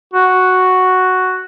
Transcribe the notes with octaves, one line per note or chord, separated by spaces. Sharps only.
F#4